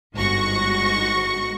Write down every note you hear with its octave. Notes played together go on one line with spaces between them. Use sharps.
G1 G#2 F#4 C#6 A#6 C#7